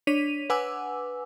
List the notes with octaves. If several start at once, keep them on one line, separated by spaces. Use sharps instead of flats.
D4 C#5 B6 D#7 F7
B4 F#5 G#5 D6 E6